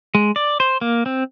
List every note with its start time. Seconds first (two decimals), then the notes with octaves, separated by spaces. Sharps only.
0.15 G#3
0.36 D5
0.60 C5
0.81 A#3
1.06 C4